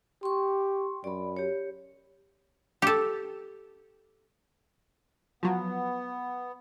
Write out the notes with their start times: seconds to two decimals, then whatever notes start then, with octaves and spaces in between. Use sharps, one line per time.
0.23 G4 C6 C#6
1.04 F#2 D5 B5
1.37 G4 C#5
2.82 G4 A4
5.43 F3 F#3 B3